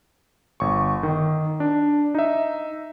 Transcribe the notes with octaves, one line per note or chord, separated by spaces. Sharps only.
G1 C#6
D#3
D4
D#4 E5